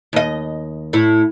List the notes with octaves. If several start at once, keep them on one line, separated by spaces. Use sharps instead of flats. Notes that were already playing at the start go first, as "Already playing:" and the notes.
D#2 D#5
A2 E4